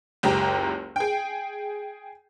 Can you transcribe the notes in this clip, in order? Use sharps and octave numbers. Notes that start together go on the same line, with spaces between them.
F#1 C#2 G4 A#5
G#4 G5